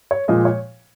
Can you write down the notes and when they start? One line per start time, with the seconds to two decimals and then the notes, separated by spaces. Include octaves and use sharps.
0.11 C#5
0.28 A#2 F3 G#3 D#5
0.45 C#5